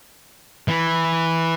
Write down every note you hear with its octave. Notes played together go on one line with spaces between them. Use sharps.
E3